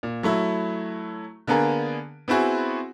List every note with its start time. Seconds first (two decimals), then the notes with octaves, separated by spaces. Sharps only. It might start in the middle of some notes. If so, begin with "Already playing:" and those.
0.03 A#2
0.23 F#3 A3 E4
1.47 D3 A#3 B3 G#4 A#4
2.28 B3 C4 E4 F#4 G#4